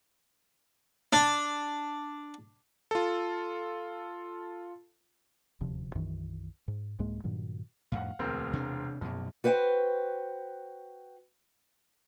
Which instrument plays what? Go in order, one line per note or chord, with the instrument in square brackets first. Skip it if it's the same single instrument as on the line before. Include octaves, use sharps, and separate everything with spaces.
[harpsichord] D4
[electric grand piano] F4 A4
[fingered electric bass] D#1 D2 C3 F3
B1 F#2 D#3 E3
G#2
C2 G#2 G#3 A#3
G2 A#2 D#3 F#3
[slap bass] F2 A2 [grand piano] F5 F#5
[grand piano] E1 C4 A#4 [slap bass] D2
[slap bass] C3 D4
[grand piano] A#1 [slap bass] F#2 B2
[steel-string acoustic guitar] F#4 B4 C5 F#5 G5